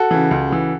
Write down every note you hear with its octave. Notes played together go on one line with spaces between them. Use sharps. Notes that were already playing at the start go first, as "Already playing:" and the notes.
Already playing: F#4 A4
C#3 E3
C#2
C#3 E3